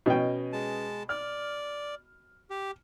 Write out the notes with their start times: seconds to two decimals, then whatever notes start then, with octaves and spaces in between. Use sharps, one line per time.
0.06 B2 B3 C#4 D#5 G5
0.53 G#3 A5
1.09 D5 F6
2.50 G4